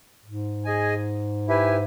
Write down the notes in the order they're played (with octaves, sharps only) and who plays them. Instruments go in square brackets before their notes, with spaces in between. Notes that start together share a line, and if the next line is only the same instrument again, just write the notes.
[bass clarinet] G#2
[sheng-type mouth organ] G#4 D#5 G#5
E4 G4 B4 E5 G#5